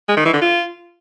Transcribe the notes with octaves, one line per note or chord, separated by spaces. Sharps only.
G#3
D#3
E3
D3
F4